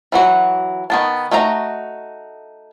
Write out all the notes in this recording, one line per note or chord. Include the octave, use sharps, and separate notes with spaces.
E3 F#3 F#4
D#3 B3 A5
A3 D#4 F#4 A#5